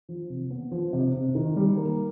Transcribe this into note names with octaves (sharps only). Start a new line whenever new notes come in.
F3
C3
B3
F3
C3
C3
D#3
G3
A#3